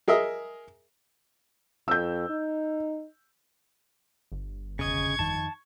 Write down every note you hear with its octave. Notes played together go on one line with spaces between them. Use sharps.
G#4 A#4 D#5 E5
F2 E6 G6
D#4
G1
E1 C#3 D#5 C#6 G#6
F2 D#3 A5